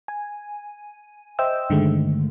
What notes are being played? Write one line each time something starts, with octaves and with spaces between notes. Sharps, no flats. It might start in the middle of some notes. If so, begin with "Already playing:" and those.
G#5
C5 D#5 E5 G5 E6
G2 D3 D#3 G#3 A3